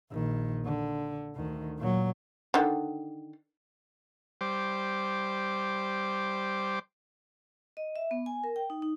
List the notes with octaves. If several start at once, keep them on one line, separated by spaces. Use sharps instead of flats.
A#1 D#3
D3
D2 D#3
A#2 F#3
D3 D#3
G3 C5 D6
D#5
E5
B3
G#5
A#4
G5
D#4
D#4